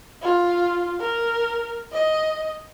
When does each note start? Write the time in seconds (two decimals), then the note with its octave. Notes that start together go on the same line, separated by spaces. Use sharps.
0.22 F4
1.00 A#4
1.92 D#5